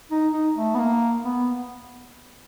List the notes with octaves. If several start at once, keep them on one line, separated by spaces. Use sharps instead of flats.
D#4
D#4
A3
B3
A#3
B3